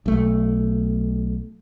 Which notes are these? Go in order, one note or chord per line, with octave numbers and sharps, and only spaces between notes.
B1 A3